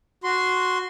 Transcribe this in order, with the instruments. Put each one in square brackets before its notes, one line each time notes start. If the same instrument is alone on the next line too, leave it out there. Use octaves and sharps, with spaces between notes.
[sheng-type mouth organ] F#4 C6